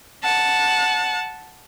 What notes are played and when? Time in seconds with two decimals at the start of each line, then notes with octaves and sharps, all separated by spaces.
0.23 F#5 A5